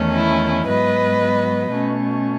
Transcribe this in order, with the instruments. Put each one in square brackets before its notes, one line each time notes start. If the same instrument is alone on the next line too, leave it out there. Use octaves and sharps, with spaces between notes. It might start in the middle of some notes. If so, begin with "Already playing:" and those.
Already playing: [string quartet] E2 D#3 A3 C#4
E4
G#2 F#3 B3 B4 D#5
B2 A3 C#4